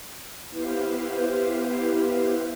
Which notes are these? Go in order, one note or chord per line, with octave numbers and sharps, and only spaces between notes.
B3 E4 G4 B4 C5 F5